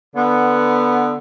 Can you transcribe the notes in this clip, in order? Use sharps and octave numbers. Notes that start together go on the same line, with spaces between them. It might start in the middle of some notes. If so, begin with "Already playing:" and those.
D3 B3